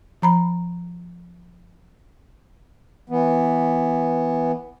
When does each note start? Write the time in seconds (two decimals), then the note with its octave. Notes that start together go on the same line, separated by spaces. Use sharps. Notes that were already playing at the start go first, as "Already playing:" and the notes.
0.22 F3 A#5 B5
3.10 E3 B3